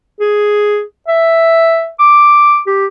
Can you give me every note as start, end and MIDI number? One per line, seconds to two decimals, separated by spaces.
0.20 0.83 68
1.08 1.89 76
1.99 2.59 86
2.67 2.86 67